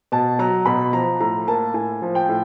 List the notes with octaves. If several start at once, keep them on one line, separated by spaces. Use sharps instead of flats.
B2 A5
F#3 A#5
B2 B5
F3 A#5
A2 A#5
A#3 A5
A2 G#5
F3
G5
A2